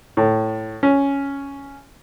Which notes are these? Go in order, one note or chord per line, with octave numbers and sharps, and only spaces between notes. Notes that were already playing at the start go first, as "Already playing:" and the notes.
A2
C#4